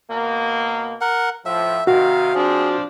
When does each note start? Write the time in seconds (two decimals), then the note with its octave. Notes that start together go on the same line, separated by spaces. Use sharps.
0.11 B2 A#3
1.01 A#4 F#5
1.46 A2 F3 E5
1.87 C3 D#3 F#4 F5
2.35 F3 C4 D4 G#4